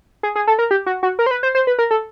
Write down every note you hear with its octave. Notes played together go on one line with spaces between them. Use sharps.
G#4
G#4
A4
A#4
G4
F#4
F#4
A#4
C5
B4
C5
C5
B4
A#4
A4